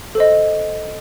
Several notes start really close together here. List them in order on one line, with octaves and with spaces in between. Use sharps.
A4 C5 D#5